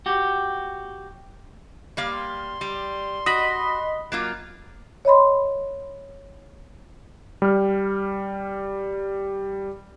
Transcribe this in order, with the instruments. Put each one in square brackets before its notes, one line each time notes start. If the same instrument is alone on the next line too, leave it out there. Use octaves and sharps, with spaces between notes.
[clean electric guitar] F#4 G4
[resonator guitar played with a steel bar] G3 A#3 F5
[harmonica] C6
[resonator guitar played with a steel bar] G3
[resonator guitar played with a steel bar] F#4 [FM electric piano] D#5 B5
[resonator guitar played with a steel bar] F#3 A#3 F4
[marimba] C#5 D#5 B5 C6
[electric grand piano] G3 F6